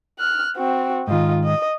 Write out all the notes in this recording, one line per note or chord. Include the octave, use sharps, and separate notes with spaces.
F6 F#6
C4 F#4
G#2 D#3 F4 D#5
D#5